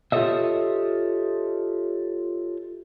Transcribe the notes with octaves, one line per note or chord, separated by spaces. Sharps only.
F4 G4 A4 C#5 D#5 E5